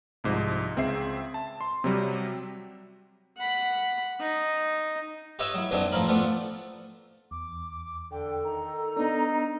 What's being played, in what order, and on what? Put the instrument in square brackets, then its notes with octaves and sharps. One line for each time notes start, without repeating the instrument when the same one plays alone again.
[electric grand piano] C2 G#2 F3
C#2 C4 G#4 E5 C7
A5
C6
C3 F#3 G3
[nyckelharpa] F#5 B5
D#4
[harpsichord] G4 B4 C#5 D#5 E5
F#3 E4
B1 F#2 D3 F#3 B3 C4
A2 F3 C4 A#4 B5
F3 A3 B3 D4
[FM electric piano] E2 [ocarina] D6
[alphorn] D3 [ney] A4 [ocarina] G5
[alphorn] D#3 [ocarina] A#5
[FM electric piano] B3 D4 [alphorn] D#4